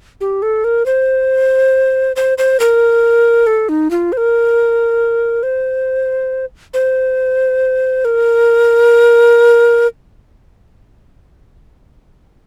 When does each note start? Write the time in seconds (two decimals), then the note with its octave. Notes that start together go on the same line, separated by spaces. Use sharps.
0.21 G4
0.42 A4
0.64 A#4
0.86 C5
2.16 C5
2.38 C5
2.60 A#4
3.47 A4
3.69 D#4
3.91 F4
4.12 C5
4.17 A#4
5.43 C5
6.74 C5
8.05 A#4